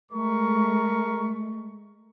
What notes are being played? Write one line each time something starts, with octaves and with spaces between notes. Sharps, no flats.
G#3 A3 A#4 C#6